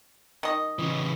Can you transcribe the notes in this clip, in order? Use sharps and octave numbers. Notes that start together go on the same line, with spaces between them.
D#3 D#5
C#3 E3